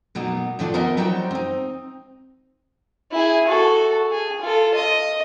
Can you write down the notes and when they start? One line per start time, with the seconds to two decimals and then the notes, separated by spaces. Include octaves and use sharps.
0.15 B2 F#3 A#3 B3 D#4
0.59 A2 D#3 F3 D4 F#4
0.74 B3 D#4 A#4 D#5 E5 G#5
0.97 F#3 G3 D#4 F#4 C5 G5
1.31 C4 D#4
3.12 E4 G#4
3.48 F#4 A4
4.11 G#4
4.41 F4 A4
4.74 D#5